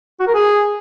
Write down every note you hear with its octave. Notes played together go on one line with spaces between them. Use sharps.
F#4
A#4
G#4